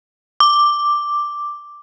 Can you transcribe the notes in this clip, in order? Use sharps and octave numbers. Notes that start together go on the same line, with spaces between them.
D6